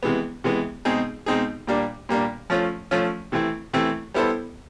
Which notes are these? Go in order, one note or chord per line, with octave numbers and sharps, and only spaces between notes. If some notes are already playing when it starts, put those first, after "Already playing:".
C3 E3 G#3 B3
C3 E3 G#3 B3
B2 G#3 C4 D#4 G#4
B2 G#3 C4 D#4 G#4
A#2 G3 A#3 D4
A#2 G3 A#3 D4
F3 A3 C#4 F4
F3 A3 C#4 F4
C3 E3 A3 C4 E4
C3 E3 A3 C4 E4
G3 B3 E4 A4 C5